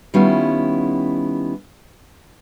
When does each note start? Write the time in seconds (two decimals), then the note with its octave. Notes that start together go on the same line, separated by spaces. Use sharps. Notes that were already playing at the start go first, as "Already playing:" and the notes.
0.14 D#3 G3 B3 C#4 E4 F4